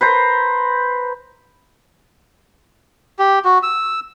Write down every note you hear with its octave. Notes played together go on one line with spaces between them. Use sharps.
B4 C5 A#5
G4
F#4
E6